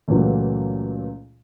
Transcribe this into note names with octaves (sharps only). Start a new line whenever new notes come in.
C#2 A#2 E3 F#3 A3 A#3